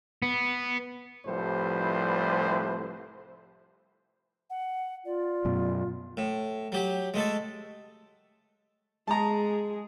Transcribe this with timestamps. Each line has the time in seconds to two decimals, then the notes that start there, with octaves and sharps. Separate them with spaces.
0.22 B3
1.26 C2 A2 F3 G3 B4 C5
4.50 F#5
5.05 F4 D5
5.45 F#2 B2
6.17 A2
6.72 F#3 G4
7.14 G#3 A3 A4
9.08 G#3 G#4 A5 A#5